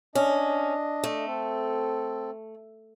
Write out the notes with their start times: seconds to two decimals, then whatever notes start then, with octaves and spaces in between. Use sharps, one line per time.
0.15 C#4 D4 D#5
1.04 A3
1.26 C4 A4